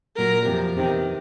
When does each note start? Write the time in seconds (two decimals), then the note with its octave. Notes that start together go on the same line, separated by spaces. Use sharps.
0.17 A#2 F#3 A#4
0.46 F2 C3 F3
0.76 E2 C3 D#3